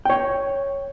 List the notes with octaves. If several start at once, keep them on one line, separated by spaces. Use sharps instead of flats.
C#5 G5